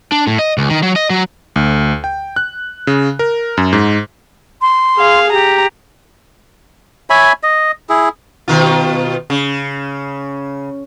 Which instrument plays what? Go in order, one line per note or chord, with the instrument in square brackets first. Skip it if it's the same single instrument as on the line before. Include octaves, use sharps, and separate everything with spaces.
[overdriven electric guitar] D4
A2
D#5
C#2
D#3
F#3
D#5
F#3
[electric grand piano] D2
G5
F#6
C#3
A#4
F#2
G#2
[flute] C6
[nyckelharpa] G#4 F5
[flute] G4 [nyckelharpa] A#5
[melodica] C#5 E5 G#5 B5
D#5
E4 G#4
[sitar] B2 D#3 F4
C#3